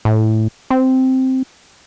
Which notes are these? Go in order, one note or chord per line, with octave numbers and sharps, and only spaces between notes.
A2
C4